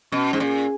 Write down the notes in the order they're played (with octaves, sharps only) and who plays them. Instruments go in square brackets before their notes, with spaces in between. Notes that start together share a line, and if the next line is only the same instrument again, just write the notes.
[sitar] B2 [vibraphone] C#4
[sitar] G#2
[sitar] A#2 [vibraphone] G#4